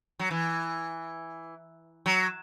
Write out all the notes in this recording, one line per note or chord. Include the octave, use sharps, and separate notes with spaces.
F#3
E3
F#3